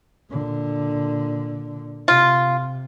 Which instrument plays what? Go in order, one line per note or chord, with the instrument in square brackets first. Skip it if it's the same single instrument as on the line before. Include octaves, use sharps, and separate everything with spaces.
[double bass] A#2 D3
[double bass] C3 [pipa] F4